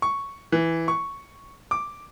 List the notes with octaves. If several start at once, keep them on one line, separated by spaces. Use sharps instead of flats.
C#6
E3
C#6
D6